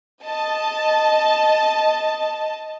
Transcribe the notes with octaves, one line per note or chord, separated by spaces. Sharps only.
D#5 A5